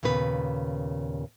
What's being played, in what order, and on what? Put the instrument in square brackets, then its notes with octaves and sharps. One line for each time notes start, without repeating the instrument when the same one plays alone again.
[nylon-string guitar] D#2 A#2 C#3 B3 B4